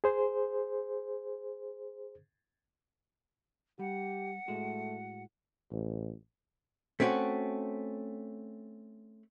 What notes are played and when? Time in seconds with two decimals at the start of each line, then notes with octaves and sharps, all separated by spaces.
0.04 G#4 C5
3.79 G3 G4 F#5
4.48 A2 G#3 A3 F#4
5.71 A1
7.00 A3 C4 C#4 F#4